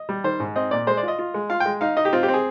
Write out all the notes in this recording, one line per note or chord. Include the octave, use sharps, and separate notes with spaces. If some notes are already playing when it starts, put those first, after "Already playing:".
Already playing: D#5
G3
D#3 C5
G#2
C4 D#5
A#2 D5
G#3 C5
D5
F4
D#5
F4
G#3
F4 F5
G5
G#3
D#4 F5
D#4 D#5
G4
C4 F4
G4
C4
G#4